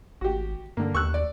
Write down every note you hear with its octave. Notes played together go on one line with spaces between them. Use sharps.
G#1 F#4 G4
G2 D3 A#3
D#2 C#6 E6 F#6
D5